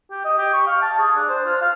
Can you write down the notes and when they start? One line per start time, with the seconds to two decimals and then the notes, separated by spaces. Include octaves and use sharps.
0.11 G4
0.25 D#5
0.38 G4
0.53 C#6
0.67 F5
0.82 A5
0.99 G#4
1.16 D4
1.29 C5
1.46 F4
1.62 F5